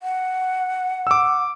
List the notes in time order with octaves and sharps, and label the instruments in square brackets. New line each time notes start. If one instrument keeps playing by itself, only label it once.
[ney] F#5
[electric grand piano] D6 E6